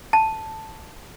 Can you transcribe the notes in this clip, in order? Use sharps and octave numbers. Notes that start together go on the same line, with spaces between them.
A5